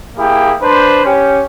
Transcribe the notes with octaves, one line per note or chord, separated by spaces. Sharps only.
A#3 E4 G4 G#4
D4 B4 C5
C#4 G4